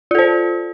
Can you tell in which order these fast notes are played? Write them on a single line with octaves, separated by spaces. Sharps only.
F4 A4 C5